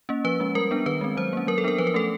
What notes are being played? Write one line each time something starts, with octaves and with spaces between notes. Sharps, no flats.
A#3 C#4
F3 B4
G#3 C#4
G3 A#4
B3 D4
D#3 B4
G#3 C4
F#3 C5
A#3 C#4
F#3 A#4
A4
B3 D4 A#4
F3 B4
A#4
A3 C#4 A4